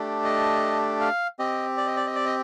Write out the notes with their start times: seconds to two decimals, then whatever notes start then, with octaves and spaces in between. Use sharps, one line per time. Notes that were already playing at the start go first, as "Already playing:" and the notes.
Already playing: A3 D4 G4
0.25 D#5
1.01 F5
1.39 C4 G4 D#5
1.77 D5
1.87 D#5
1.97 D5
2.06 D#5
2.15 D5
2.25 D#5